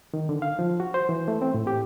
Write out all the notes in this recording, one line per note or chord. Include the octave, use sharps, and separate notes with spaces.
D#3
D3
F5
F3
F#4
C5
E3
A3
C4
A2
G4